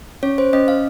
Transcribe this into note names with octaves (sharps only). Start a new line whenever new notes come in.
C#4 C#5
C5
C#4 D#5
F5